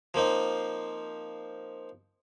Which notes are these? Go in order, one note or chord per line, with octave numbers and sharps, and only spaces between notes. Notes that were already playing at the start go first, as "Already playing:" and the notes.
F3 A#3 C4 D#4